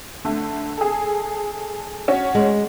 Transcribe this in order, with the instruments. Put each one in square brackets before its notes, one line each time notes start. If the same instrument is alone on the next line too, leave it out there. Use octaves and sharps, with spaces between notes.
[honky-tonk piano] D3 A3
G#4 A4
C#4 F#4
[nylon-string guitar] G#3